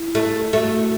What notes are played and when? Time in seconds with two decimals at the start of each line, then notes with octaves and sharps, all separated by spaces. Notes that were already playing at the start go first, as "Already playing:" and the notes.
Already playing: E4
0.15 A3
0.52 A3 F#4